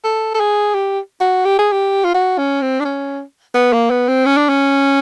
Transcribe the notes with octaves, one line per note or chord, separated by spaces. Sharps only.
A4
A4
G#4
G4
F#4
G4
G#4
G4
F4
F#4
C#4
C4
D4
C#4
B3
A#3
B3
C4
C#4
D4
C#4